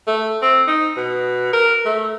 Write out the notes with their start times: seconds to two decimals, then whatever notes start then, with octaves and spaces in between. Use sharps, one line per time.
0.07 A3
0.42 C4
0.67 D#4
0.97 B2
1.53 A#4
1.85 A3